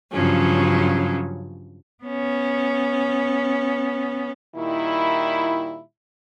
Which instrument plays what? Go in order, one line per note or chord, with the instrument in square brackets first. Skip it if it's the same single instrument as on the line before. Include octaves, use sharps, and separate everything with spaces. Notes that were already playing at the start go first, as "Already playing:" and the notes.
[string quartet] G2 C#3 F3 F#3 C#4
[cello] B3 C#4
[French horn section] A#2 D#3 G3 E4